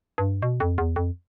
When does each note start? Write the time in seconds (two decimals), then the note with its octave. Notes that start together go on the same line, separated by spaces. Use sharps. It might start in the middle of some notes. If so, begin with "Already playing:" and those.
0.18 G2
0.42 B2
0.60 F2
0.78 E2
0.96 F2